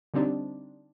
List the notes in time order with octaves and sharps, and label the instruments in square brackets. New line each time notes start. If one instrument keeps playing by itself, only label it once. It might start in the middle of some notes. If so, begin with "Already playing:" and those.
[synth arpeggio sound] D3 G3 C4 D4 D#4 G4